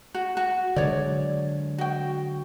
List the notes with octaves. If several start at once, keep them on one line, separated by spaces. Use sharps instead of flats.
F#4
F#4
D3 F#3 G#3 C#5 D5
F#4 G5